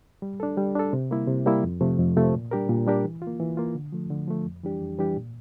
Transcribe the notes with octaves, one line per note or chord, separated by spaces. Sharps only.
G3
D4 A4
G3
D4 A4
C3
G3 A#3 E4
C3
G3 A#3 E4
F2
C3 F3 A3
F2
C3 F3 A3
A#2
G3 D4 G4 A#4
A#2
G3 D4 G4 A#4
E3
F4
A#3
E3
A#3 F4
D3
F3 A3
D3
F3 A3
F2
E3 G3 D4 G4
F2
E3 G3 D4 G4
A#2